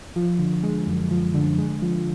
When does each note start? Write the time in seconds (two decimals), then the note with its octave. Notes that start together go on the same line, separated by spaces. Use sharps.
0.16 F3
0.39 D3
0.63 G#3
0.87 F#2
1.11 F3
1.34 D3
1.58 G#3
1.82 F3